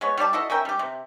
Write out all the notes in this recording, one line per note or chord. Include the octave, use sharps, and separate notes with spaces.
G#3 B3 C#5
G3 G4 D5 A5
E4 F#4 A4 D#5
C#4 A#4 E5 G5
G3 G4
C3